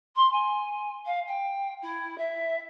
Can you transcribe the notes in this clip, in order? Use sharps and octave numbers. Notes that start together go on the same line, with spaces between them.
C6
G#5
F5
G5
E4
E5